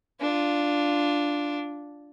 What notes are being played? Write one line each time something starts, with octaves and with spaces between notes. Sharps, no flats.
D4 F4